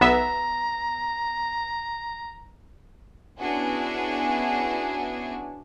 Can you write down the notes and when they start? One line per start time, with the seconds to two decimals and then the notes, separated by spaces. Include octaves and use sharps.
0.01 B1 B3 E5 A#5
3.39 B3 C#4 D4 E4 F#4 G#4